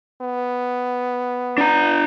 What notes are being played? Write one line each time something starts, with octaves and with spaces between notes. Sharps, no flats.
B3
D4 A#5